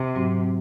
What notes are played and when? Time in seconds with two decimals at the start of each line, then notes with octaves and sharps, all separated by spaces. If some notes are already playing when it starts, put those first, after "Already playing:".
Already playing: C3
0.15 G#2 F#3 C4 F#4